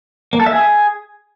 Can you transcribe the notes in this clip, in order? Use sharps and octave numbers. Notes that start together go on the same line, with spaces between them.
A#3
A4
E5
G#4